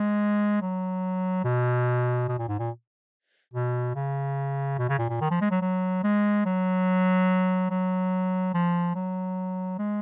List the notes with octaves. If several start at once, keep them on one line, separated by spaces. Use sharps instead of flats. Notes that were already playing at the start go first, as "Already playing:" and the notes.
Already playing: G#3
F#3
B2
B2
A#2
G#2
A#2
B2
C#3
B2
C#3
A#2
A#2
D#3
F3
G#3
F#3
F#3
G#3
F#3
F#3
F3
F#3
G#3